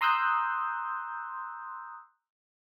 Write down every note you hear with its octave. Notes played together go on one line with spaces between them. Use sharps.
A#5 C6 D#6 E6 F#6 G6